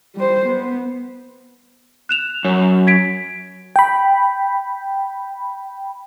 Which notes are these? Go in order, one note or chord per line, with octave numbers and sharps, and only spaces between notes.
G3 C5
B3
F#6 E7 F7
F#2 C#5
G#6 B6 D7
G5 B5